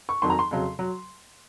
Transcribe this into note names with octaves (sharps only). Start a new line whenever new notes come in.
C#6
F2 D#3 F#3 C6
A#5
C6
F2 C#3 F#3
F#3